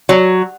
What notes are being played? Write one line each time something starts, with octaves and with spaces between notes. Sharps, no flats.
F#3